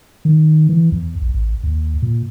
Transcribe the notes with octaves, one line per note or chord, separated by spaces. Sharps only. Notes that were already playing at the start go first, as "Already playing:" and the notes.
D#3
E3
E2
A#1
A1
D#2
A#2